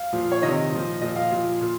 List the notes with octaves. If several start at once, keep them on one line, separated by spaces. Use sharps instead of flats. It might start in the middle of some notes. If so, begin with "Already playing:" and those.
Already playing: F5
A#2 F3
C#5
C3 D#3 D#5
A#2 F3
A#2 F3 D#5
F5
A#2 F3
A#2